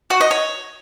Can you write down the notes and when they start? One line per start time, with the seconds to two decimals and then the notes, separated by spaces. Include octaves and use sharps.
0.10 F#4
0.21 D#5
0.31 C#5